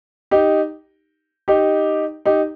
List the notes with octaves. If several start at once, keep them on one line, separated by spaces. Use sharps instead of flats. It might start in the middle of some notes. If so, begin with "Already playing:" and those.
D#4 G4
D#4 G4
D#4 G4